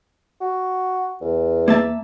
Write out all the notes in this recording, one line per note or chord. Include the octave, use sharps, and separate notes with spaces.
F#4
E2
A#3 E5 A5